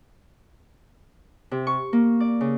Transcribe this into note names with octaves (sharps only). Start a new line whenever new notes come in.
C3
C#6
A#3
D5
C#3